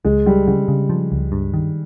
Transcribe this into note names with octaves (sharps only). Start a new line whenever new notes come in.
C#2 G#3
G3 G#3
C#3 G3
C#3
F3
C#2
G2
D#3